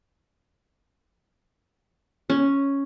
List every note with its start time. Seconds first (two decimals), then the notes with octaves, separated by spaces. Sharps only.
2.30 C#4